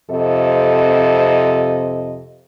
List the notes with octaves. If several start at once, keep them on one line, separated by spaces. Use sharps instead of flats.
F2 C3 A4 D#5